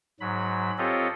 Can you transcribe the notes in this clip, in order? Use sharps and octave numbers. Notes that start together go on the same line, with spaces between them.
G#2 F#3 B5
C4 F4 G4 A4 C#5 D#5